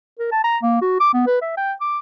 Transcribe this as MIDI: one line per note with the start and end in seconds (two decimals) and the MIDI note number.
0.19 0.32 70
0.32 0.42 81
0.44 0.57 82
0.63 0.78 58
0.82 0.98 66
1.00 1.11 86
1.14 1.26 59
1.27 1.39 71
1.42 1.56 76
1.57 1.73 79
1.81 1.99 86